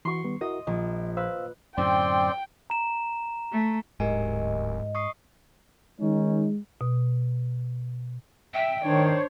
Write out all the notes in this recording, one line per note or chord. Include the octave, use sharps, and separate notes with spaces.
E3 F#4 C6 C#6
D#3 G3 B3
E4 F#4 A#4 D#5
A#1 D#5
B4 C5 F5 E6
F#2 A2 D3 C4 D5 G5 C6
A#5 E7
A3
D1 G#2 G4 A#4 D#5 G#5
C#6 D#6 C7
D#3 G#3 C#4 D#4
B2
E5 G5
D#3 D4 C5 C#5